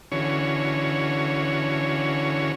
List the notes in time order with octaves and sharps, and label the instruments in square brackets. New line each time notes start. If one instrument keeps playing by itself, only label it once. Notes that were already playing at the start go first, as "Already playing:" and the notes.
[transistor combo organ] D3 E3 C#4 F#4 C#5